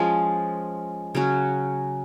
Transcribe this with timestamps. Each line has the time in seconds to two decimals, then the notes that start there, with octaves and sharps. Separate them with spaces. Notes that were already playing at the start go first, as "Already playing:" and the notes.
Already playing: F3 G#3 C#4
1.15 C#3 F#3 C#4 F#4